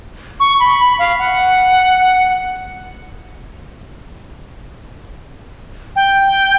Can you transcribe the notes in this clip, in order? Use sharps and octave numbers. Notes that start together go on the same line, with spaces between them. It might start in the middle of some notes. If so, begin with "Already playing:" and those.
C#6
B5
B5
F5
F#5
G5